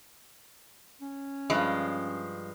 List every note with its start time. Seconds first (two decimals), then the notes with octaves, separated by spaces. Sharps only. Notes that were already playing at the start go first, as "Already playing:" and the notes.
1.01 C#4
1.50 G2 F3 G#3